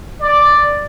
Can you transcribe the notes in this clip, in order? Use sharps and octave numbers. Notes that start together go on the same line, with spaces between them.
D5